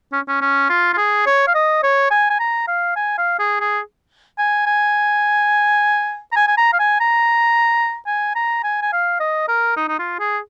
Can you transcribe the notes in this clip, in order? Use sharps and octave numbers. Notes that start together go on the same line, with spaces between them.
C#4
C#4
C#4
F4
F4
G#4
C#5
F5
D#5
C#5
G#5
G#5
A#5
F5
G#5
F5
G#4
G#4
G#5
G#5
A#5
G#5
G#5
A#5
F5
G#5
A#5
G#5
A#5
G#5
G#5
F5
D#5
A#4
D#4
D#4
F4
G#4